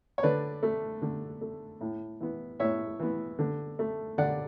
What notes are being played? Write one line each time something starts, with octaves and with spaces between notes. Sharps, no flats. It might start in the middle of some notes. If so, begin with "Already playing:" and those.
C#5
D3 B4 D5
A3
D3
A3
A2
E3 B3
A2 C#5 E5
E3 B3
D3
A3
D3 D5 F#5